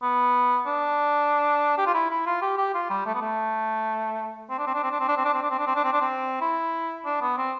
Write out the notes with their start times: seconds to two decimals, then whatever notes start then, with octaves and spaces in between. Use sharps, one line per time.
0.02 B3
0.66 D4
1.78 G4
1.86 F4
1.94 E4
2.10 E4
2.26 F4
2.42 G4
2.58 G4
2.74 F4
2.90 G3
3.06 A3
3.14 B3
3.21 A3
4.50 C4
4.58 D4
4.67 C4
4.75 D4
4.83 C4
4.91 D4
5.00 C4
5.08 D4
5.17 C4
5.25 D4
5.34 C4
5.42 D4
5.50 C4
5.59 D4
5.67 C4
5.76 D4
5.84 C4
5.92 D4
6.01 C4
6.41 E4
7.05 D4
7.21 B3
7.37 C4